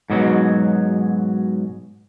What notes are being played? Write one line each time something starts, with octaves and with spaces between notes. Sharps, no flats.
G#2 B2 F#3